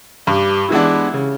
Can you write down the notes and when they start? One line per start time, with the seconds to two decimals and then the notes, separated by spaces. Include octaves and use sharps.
0.27 G2 G4
0.70 E3 G#3 B3 D4 E4
1.14 C#3